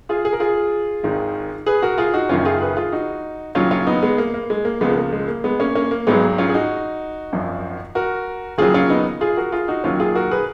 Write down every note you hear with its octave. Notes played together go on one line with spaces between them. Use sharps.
F4 G#4
G#4
A#4
F4 G#4
G#1 G#2 D#3
G#4 B4
F#4 A#4
F4 G#4
D#4 F#4
F#1 F#2 D#3 C#4 F4
F4 G#4
G#4 B4
F4 G#4
D#4 F#4
D#2 C#3 F#3 C#4 F4
C#4 F4
B3 D#4
G#3 B3
A#3
A#3
G#3
A#3
C#2 C#3 F3 G#3 B3
G#3
A#3
G#3
A#3
G#3 B3
A#3 C#4
A#3 C#4
A#3
G#1 G#2 F#3 G#3 B3
C#4 F4
G#4
D#4 F#4
G#1 F#2 F3
F#4 A#4
D#2 C#3 F#3 F4 G#4
C#4 F4
B3 D#4
F4 G#4
F#4 A#4
F4 G#4
D#4 F#4
D#2 D#3 F#3 C#4 F4
F4 G#4
F#4 A#4
G#4 B4